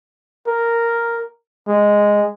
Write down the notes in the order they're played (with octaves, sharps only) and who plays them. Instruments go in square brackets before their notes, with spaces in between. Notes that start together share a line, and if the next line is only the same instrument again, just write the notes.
[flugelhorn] A#4
G#3